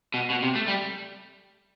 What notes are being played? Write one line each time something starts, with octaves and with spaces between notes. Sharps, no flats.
B2
B2
C3
A3
G3